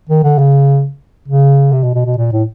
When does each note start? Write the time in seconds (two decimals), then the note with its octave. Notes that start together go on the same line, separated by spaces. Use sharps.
0.09 D#3
0.23 D3
0.38 C#3
1.28 C#3
1.72 C3
1.83 B2
1.95 B2
2.06 B2
2.17 A#2
2.32 A2